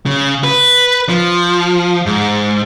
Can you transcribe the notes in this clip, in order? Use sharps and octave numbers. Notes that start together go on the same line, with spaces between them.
C#3
B4
F3
G#2